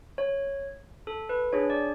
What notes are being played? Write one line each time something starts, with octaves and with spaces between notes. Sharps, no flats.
C#5
A4
B4
D4 G#4 C#5
D5